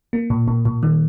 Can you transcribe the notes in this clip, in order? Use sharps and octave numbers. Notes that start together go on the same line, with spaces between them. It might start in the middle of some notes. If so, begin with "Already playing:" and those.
A#3
A#2
A#2
A#2
D#3